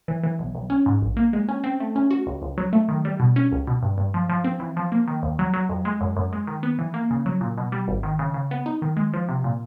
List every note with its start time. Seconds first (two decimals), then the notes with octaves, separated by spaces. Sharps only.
0.08 E3
0.24 E3
0.39 B1
0.55 B1
0.70 C#4
0.86 G#2
1.02 A#1
1.17 A#3
1.33 G#3
1.49 C#4
1.64 C4
1.80 A3
1.96 C#4
2.11 F#4
2.27 C#2
2.42 C#2
2.58 F#3
2.73 A3
2.89 D#3
3.05 G3
3.20 B2
3.36 C#4
3.52 C#2
3.67 B2
3.83 G2
3.98 G2
4.14 F3
4.29 F3
4.44 C4
4.60 E3
4.77 F3
4.92 A#3
5.08 D#3
5.23 D#2
5.39 F#3
5.54 F#3
5.69 F2
5.85 G#3
6.01 F#2
6.17 F#2
6.33 G#3
6.47 D#3
6.63 B3
6.79 E3
6.94 A#3
7.11 C#3
7.26 F#3
7.41 A#2
7.57 B2
7.72 G3
7.88 G#1
8.03 D#3
8.19 C#3
8.34 C#3
8.51 B3
8.66 D#4
8.82 D#3
8.97 G#3
9.13 F3
9.29 C3
9.44 A#2